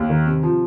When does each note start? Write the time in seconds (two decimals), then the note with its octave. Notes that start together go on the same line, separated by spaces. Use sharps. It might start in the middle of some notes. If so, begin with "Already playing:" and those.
Already playing: D#2
0.09 D#3
0.26 C3
0.43 F3